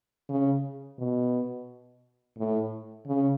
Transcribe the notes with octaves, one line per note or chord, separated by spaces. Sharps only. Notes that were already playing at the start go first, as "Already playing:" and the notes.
C#3
B2
A2
C#3